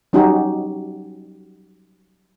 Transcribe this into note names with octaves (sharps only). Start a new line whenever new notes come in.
F#3 G3 C#4 D#4 F#4 G4